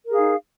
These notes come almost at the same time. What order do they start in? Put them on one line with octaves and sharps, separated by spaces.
A#4 G#4 F5 D#4